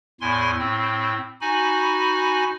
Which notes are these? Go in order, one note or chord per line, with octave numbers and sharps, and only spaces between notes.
E2 A2 E4 G#5 C6
A2 C4
D#4 F#4 G#5 B5